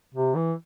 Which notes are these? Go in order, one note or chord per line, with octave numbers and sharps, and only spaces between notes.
C3
E3